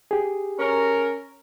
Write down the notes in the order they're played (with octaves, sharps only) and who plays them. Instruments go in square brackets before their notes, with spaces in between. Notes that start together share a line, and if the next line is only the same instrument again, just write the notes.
[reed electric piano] G4 G#4
[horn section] C#4 A#4